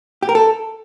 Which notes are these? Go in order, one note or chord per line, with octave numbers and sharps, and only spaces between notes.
G4
A#4
A4